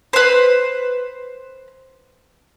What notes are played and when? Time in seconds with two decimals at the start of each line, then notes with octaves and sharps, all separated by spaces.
0.13 B4 C5